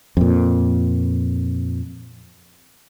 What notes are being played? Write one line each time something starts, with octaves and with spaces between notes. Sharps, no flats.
F2 A#2